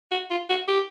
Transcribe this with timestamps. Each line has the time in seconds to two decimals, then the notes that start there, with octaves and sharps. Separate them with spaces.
0.11 F#4
0.31 F4
0.49 F#4
0.68 G4